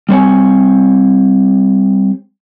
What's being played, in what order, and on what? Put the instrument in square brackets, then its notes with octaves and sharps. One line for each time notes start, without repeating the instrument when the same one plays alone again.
[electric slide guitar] G3 C4 C#5 G#5